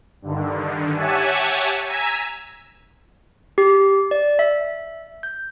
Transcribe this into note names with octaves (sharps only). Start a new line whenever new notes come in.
G2 D3 D#3
G4 C#5 E5 F#5 G#5 A5
G#5 A#5 E6 G#6 B6
G4
D5
E5
G6